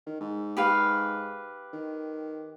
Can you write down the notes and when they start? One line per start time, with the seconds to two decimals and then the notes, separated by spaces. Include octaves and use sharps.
0.06 D#3
0.21 G#2
0.57 G4 B4 F5
1.73 D#3